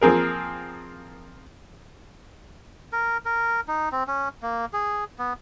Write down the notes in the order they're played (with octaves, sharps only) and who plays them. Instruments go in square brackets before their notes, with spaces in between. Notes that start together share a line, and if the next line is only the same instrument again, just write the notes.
[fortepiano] F3 A#3 C4 G#4 A#4
[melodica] A#4
A#4
D#4
C4
C#4
A#3
G#4
B3